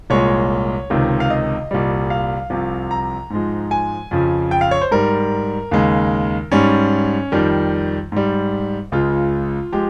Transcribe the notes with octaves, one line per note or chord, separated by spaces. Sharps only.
C2 A#2 G#3 C#5
C#2 C3 D#3
F5
D#5
C2 A#2 G3
F5
C2 C3 F3
A#5
G#2 F3 G#3
G#5
F2 C#3 F3
G5
F5
C#5
C5
G#2 G3 A#4
D#2 C#3 G#3
G#2 G3 C#4
F2 D#3 G3
G#2 G3
C#2 C#3 G#3 F4
F3 G#3 G4